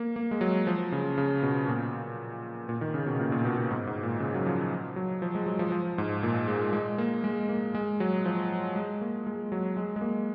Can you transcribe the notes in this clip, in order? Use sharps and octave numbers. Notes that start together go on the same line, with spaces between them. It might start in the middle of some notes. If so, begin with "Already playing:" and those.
Already playing: A#3
A#3
G#3
F#3
F3
C#3
C#3
B2
A#2
A#2
D#3
C#3
B2
A#2
A#2
B2
A#2
G#2
G#2
A#2
C#3
F#3
F3
F#3
F3
G#3
F#3
F3
F3
G#2
A#2
G#3
G#3
A#3
G#3
A#3
G#3
F#3
F3
G#3
A#3
G#3
F#3
G#3
G#3
A#3